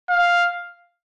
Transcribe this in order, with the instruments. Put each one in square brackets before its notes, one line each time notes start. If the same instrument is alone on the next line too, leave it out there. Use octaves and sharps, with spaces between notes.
[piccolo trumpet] F5